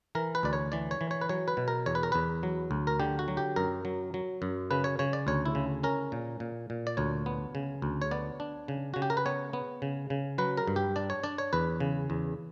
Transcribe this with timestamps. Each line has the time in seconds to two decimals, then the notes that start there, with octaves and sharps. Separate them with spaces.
0.15 E3 A#4
0.35 B4
0.43 D2 D5
0.53 C#5
0.72 E3 D5
0.91 C#5
1.01 E3
1.11 C#5
1.21 B4
1.29 F#3 C#5
1.48 B4
1.57 B2
1.68 A#4
1.86 E2 C#5
1.95 B4
2.03 A#4
2.12 E2 B4
2.43 F#3
2.71 D2
2.87 A#4
3.00 D3 G4
3.19 F#4
3.28 F#3
3.37 G4
3.56 F#2 A#4
3.85 F#3
4.14 F#3
4.42 F#2
4.71 C#3 B4
4.84 C#5
4.99 C#3 C#5
5.13 D5
5.27 D2 C#5
5.46 E4
5.55 C#3
5.83 C#4 A#4
6.12 A#2
6.40 A#2
6.70 A#2
6.87 D5
6.97 D2 C#5
7.26 B3
7.55 C#3
7.82 D2
8.02 C#5
8.11 B3 D5
8.40 D4
8.68 C#3
8.94 C#3 F#4
9.02 G4
9.10 A#4
9.17 B4
9.26 B3 C#5
9.53 B3
9.82 C#3
10.10 C#3
10.38 F#3 B4
10.57 A#4
10.67 G2
10.76 G4
10.96 D4 D5
11.10 C#5
11.23 D4 D5
11.38 C#5
11.53 E2 B4
11.80 C#3
12.10 E2